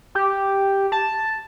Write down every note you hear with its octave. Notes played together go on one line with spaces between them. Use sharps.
G4
A5